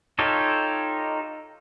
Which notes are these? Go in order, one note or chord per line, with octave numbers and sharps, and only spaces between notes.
D#4 F4 G4 A4 C#5